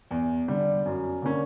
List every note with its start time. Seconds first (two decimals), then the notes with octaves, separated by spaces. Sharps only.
0.11 E2
0.48 D3 G3
0.85 F#2
1.22 D3 A#3 C#4